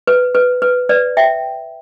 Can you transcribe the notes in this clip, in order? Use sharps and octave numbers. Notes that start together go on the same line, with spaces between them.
B4
B4
B4
B4 D5
E5 G5